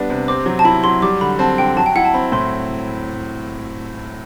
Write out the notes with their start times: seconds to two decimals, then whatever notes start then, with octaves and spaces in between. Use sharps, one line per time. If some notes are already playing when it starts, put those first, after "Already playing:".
Already playing: G3 B3 D4
0.10 C3
0.28 C4 D6
0.46 F#3
0.59 A5
0.65 E4 B5
0.84 F#3 C6
1.02 G3 D6
1.21 D3 B5
1.39 C4 A5
1.58 D3 G5
1.77 F#3 A5
1.86 G5
1.96 E4 F#5
2.05 A5
2.14 C4 B5
2.32 A2 C6